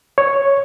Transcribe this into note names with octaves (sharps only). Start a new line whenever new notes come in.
C#5